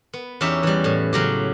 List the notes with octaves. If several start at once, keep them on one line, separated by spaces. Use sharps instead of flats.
B3
E2 C#4 D#4 G4 E5
E3 G3
A2
C#3 F#3 G4